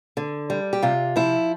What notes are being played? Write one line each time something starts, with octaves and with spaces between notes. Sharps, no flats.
D3
G3
G4
C3 F4
F3 E4